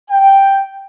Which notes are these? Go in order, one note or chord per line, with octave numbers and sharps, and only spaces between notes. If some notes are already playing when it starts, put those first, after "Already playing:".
G5